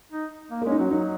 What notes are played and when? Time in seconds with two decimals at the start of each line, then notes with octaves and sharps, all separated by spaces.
0.12 D#4
0.51 A#3
0.61 A#3
0.65 G#3 C#4
0.71 D#4
0.78 F#3 F#4
0.91 F#3 D#4